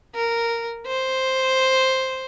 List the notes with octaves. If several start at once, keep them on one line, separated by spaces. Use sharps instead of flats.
A#4
C5